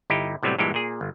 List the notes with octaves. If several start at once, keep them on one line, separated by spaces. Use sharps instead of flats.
G1 D#4 E4 G4
A2 C3 F#3 G3 B3
G2 A#2 E3 G#3 G4
A#2 G#4
G1